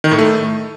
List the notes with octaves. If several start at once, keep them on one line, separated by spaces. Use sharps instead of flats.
D#3
A2
A3